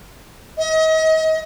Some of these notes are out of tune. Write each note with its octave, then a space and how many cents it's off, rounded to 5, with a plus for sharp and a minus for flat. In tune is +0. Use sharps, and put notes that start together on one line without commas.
D#5 +35